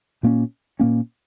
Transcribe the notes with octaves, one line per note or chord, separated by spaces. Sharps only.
A#2 A#3 C#4
A#2 A#3 C#4